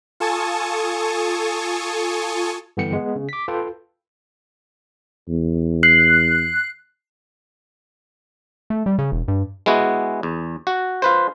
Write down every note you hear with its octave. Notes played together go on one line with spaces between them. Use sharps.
F4 A4 G#5 A5 C#6 D#6
G2 D3 E3 B3 G5 C#7
G#3 B3
C#3
D6 B6
F4 A4 B4 G5
E2
F#6 C7
A3
G3
C#3
E1
G2
G#3 B3 E4 F#4
E2
F#4
F4 B4 C5